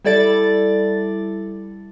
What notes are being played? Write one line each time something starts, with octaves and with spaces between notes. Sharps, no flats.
G3 E4 A4 D5 A6